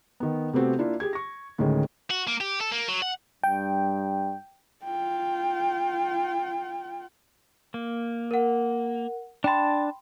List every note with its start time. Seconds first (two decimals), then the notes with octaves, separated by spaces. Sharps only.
0.20 D#3 B3
0.53 C3 A3 B3 C4 F#4 G4
0.78 A#3 D4 E4 F4
1.00 G4 G#4 G#6
1.13 C#6 A#6
1.58 D2 A2 D#3 G#3 C#4
2.10 F#4
2.27 A#3
2.41 G4
2.61 A4
2.72 A#3
2.89 F#3
3.02 F#5
3.44 G2 G5
4.84 F4 G5
7.74 A#3
8.31 A#4 F#5
9.44 D4 G5 A5 B5 C6